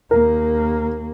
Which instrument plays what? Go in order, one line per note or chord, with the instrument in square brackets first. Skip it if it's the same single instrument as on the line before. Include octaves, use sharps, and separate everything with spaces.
[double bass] D#2 A#3 [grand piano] A#4